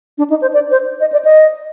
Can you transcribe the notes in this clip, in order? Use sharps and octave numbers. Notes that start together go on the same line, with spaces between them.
D4
D#4
C5
D5
C5
D#5
D5
D#5